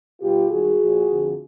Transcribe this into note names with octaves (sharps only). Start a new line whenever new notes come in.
B2 G3 F4 G4
G#2 D#3 G3 F#4 G#4
A#2 F3
F2 D3 F3